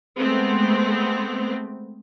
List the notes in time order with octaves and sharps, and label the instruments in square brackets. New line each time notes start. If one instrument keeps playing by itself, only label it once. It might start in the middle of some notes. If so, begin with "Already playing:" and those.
[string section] G#3 A3 B3 C4